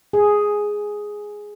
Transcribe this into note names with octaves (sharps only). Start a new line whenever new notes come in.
G#4